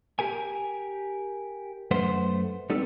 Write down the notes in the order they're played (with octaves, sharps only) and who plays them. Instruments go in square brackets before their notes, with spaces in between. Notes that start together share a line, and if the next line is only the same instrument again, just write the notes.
[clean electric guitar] G4 A#4 G#5
F#2 A3 B4 C5 F#5 C6
G3 B3 C4 D4 D#4 A4